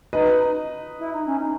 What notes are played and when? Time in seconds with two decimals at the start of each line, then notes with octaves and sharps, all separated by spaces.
0.13 D#4 B4 D#5
0.99 E4
1.12 D#4
1.26 C#4
1.39 D#4